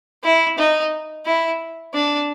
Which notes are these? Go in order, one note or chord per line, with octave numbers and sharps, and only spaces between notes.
E4
D#4
E4
D4